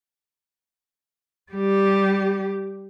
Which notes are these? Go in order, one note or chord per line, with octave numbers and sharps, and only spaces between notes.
G3 G4